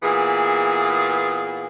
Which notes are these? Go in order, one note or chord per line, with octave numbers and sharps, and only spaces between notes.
A#2 E3 B3 G#4